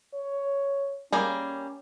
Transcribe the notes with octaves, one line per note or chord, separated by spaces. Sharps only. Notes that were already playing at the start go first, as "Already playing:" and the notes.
C#5
G3 A#3 C#4 G#4